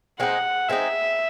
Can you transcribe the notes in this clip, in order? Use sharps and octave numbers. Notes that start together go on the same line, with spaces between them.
G#3 C4 D#4 F#5
G#3 C4 D#4 E5